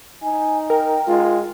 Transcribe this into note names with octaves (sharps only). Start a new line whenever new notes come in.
D#4 G#5
A#4 G5
G#3 F4